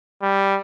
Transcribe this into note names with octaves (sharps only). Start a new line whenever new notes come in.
G3